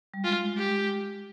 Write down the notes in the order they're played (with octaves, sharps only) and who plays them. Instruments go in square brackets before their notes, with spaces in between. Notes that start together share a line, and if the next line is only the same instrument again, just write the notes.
[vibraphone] G3
[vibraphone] G#3 [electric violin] F4
[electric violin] G4